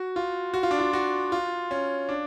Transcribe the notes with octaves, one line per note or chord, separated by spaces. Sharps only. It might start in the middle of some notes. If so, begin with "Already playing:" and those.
Already playing: F#4
F4
F#4
F4
D4
F4
F#4
F4
C#4
D4